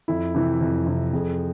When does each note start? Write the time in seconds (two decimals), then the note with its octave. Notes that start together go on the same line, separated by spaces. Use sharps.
0.08 F2 E4
0.35 C3 E3
0.61 F2
0.87 C3 E3
1.13 F2 G#4